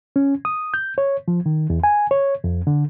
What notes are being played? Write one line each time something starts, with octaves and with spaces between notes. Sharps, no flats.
C#4
D#6
G6
C#5
F3
D#3
E2
G#5
C#5
F2
D3